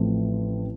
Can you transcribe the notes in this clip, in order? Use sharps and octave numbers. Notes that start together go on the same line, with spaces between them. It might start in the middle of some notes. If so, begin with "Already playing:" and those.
Already playing: A1 A2 F3 A3 C4